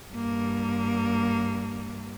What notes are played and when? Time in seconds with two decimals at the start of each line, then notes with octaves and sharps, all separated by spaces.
0.13 G2 A#3